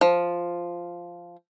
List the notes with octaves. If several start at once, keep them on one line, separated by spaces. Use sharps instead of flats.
F3